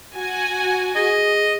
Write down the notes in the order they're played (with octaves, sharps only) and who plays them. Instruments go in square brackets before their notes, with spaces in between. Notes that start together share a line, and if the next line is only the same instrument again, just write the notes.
[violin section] F#4 G#5
[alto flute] G#4 [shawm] D#5